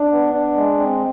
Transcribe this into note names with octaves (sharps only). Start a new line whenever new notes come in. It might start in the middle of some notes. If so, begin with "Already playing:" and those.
Already playing: D4
B3
D4
G#3
C4